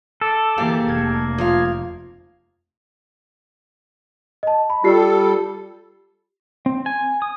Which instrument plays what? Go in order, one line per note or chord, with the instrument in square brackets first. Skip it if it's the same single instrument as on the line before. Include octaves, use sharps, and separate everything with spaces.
[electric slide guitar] A4 [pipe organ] D6
[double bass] E3 A#3 [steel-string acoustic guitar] G4 G#4 F5
[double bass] F1 [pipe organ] A#3 G#6
[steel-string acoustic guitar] F3 F5
[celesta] D#5 A5
B5
[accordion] G3 A4 [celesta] F4 G4 C7
[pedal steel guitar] C4
G#5
D#6